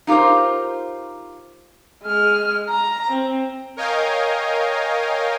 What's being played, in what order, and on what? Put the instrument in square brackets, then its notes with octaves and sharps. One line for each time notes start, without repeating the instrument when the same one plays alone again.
[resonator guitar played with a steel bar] D#4 F4 G4 A#4 C5
[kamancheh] G#3 F6
A#5
C4
[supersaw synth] A#4 C#5 D#5 F5 G5 G#5